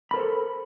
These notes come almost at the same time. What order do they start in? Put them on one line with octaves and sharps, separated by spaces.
B5 A#4 C5 A4